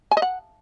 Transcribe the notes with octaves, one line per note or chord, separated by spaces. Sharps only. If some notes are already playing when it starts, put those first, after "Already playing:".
G#5
D#5
F#5